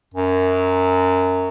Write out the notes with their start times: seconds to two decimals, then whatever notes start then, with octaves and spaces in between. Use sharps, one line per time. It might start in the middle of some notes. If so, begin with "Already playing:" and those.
0.14 F#2